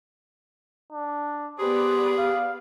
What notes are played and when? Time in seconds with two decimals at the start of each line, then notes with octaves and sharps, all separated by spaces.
0.92 D4
1.59 B3 G4 G#4 B4 C5 D5
2.18 F5